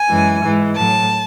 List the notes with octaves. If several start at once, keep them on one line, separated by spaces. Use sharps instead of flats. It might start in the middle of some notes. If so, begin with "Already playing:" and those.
Already playing: G#5
F#2 E3 G#3
G#2 E3 G#3
A2 F#3 A5